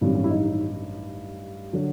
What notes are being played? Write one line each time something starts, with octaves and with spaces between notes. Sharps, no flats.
A1 G2 D#3 F#3 C4
C#4
E4
D#4
D#4
D3 F#3